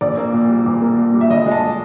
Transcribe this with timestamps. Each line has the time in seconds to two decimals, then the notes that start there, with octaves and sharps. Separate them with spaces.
0.01 A#1 D5
0.17 A#3
0.33 A#2
0.49 G3
0.66 A#1
0.82 A#3
0.98 A#2
1.14 G3
1.21 E5
1.30 G1 D#5
1.46 G#3
1.51 A5